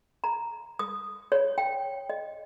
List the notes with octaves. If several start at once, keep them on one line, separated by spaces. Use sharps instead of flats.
A#5
D#6
C#5
G5
D#5